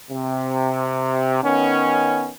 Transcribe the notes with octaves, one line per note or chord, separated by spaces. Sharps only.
C3
D#3 B3 C#4